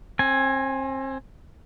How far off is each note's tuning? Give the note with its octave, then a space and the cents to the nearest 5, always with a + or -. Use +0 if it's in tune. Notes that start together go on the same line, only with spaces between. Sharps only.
C4 +30 G#5 +0